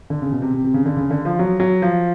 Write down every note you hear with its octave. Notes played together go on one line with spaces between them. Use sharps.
D3
C#3
B2
C3
C3
C3
C#3
D3
C#3
D3
F3
F#3
F#3
F3